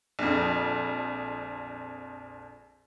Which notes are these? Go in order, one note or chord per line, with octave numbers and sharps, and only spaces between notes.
A#1 F2